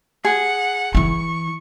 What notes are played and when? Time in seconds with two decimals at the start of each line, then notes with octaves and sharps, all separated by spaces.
0.25 G#4 F#5
0.95 E3 E4 C#6